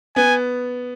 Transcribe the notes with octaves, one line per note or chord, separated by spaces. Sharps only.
B3 G#5